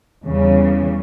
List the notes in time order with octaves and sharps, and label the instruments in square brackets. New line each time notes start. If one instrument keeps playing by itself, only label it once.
[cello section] E2 C#3 G3